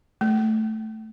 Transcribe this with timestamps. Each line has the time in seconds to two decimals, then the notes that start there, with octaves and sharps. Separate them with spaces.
0.21 A3